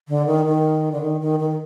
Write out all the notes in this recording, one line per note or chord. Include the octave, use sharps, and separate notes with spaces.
D3
D#3
D#3
D3
D#3
D#3
D#3